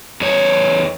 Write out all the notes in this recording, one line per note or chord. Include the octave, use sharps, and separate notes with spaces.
E2 C#5